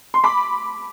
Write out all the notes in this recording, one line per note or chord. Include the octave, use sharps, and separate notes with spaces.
C6
B5 D6